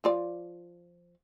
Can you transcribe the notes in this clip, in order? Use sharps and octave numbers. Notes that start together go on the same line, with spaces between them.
F3 F4 D5